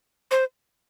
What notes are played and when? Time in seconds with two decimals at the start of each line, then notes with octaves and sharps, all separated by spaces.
0.31 C5